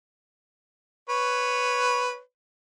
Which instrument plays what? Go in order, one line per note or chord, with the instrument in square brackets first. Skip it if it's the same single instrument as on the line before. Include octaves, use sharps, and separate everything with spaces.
[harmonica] B4 C#5